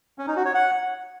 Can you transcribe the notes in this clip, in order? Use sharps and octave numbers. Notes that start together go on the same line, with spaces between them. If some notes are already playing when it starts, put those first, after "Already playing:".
C#4
D#4
F#4
C#5
F#5